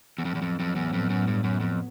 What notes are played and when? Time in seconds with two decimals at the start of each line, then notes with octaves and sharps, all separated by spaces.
0.18 E2
0.25 F2 A2 F#3 B3
0.35 E2
0.42 F2
0.60 F2
0.76 E2
0.93 F2
1.10 F#2
1.27 G2
1.44 F#2
1.60 F2